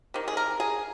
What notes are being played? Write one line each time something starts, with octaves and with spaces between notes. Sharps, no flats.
C3 D#3
G#4
A#4
G#4